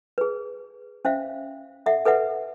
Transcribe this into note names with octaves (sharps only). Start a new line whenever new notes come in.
G#4 B4
C#4 C5 E5 F5
A4 E5 F#5
A4 B4 E5 F#5